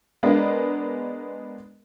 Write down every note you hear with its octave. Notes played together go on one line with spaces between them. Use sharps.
G#3 B3 D4 A#4 D#5